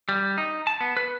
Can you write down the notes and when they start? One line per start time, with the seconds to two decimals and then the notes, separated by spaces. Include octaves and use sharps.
0.09 G3
0.38 D#4
0.67 A5
0.81 B3
0.97 B4